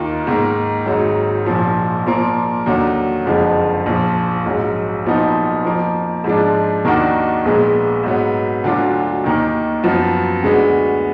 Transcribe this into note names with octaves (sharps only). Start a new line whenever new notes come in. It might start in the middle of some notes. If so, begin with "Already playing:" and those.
Already playing: D#2 D#3 A#3 F4
G#2 D#3 A#3
G#1 G#2 F#3
A#1 A#2 F3
A#2 F3 A#3
D#2 D3 F#3
F#1 F2 D3 F3 G#3
A#1 A#2 F3
A#1 G#2 F#3
B1 A#2 F3 B3 D#4
F2 F3 A#3
G#2 F3 G#3 D4
D#2 D#3 A#3 D4 F#4
A#1 A#2 G#3 B3
G#2 F#3 B3
D2 D3 F#3 D4 F4
D#2 D#3 A#3
F#2 F3 B3 F4
D2 D3 G#3 B3